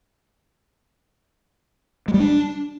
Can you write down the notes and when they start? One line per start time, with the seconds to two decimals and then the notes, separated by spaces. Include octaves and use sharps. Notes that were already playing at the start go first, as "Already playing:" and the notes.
2.08 G#3
2.14 G3
2.20 D4